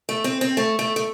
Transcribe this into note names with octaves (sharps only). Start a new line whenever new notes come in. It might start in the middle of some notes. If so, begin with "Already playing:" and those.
A3
C4
C4
A3
A3
A3